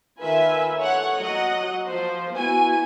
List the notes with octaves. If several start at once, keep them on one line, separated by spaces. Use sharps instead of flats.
D#3 F4 B4 E5 G#5
A4 C#5 F#5
F#3 D#5 F#5
F3 C5
B3 E4 F#4 G#5